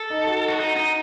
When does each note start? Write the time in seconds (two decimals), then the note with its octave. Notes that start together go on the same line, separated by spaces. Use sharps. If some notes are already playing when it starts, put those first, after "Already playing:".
Already playing: A4
0.10 D#4
0.27 F#4
0.48 F#4
0.60 D#4
0.76 D#4